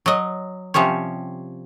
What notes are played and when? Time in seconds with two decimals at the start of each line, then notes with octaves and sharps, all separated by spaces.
0.06 F#3 D#5
0.74 C3 F3 G3 C#4 C#5